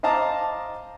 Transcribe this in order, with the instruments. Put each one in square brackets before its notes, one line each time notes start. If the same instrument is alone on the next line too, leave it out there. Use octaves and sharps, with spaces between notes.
[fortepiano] C5 D#5 F5 A5 A#5 D6